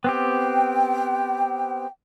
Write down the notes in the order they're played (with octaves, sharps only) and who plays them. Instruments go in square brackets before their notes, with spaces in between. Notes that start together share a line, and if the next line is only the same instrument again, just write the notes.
[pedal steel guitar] B3 C4 G4 [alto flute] G5